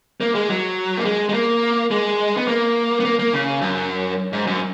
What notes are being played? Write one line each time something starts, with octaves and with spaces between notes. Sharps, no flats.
A#3
G#3
F#3
A#3
G#3
G#3
A#3
G#3
B3
A#3
B3
A#3
A#3
C#3
F#2
G#2
F#2